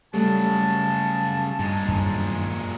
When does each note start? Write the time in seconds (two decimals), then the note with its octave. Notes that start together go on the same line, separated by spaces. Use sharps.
0.14 C#3 F#3 G3 A3 A5
1.59 G2 A#2 G#3
1.88 F#2 D#3 D4